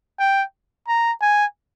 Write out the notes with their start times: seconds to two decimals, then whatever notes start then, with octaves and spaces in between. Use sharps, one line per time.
0.20 G5
0.88 A#5
1.21 G#5